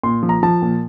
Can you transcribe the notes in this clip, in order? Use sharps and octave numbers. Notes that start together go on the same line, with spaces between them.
A#2 C6
F3
A#5
F3 A5
A#2